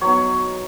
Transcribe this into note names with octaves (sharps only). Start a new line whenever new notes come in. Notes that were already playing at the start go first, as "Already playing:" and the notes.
F#3 B3 D#4 C#5